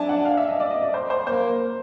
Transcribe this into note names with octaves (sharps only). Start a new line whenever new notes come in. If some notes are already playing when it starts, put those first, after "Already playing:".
Already playing: D4 E5 G#5 A5
F#5
F5
E5
D#5
D5
D#5
D5
C5
C5
A#3 C5